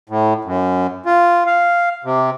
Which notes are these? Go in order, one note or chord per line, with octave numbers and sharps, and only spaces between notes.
A2
F#2
F4
F5
C3